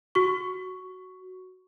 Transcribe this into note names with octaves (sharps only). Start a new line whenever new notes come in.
F#4 C#6